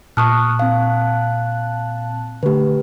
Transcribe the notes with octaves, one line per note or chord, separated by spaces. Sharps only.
A#2 A5 C#6 D#6 F6 F#6
C4 F5
D3 A3 G4 B4